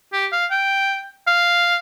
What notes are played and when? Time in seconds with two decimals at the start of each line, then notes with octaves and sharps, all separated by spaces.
0.13 G4
0.33 F5
0.51 G5
1.27 F5